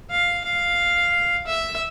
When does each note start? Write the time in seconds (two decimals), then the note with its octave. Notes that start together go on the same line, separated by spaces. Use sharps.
0.10 F5
0.44 F5
1.47 E5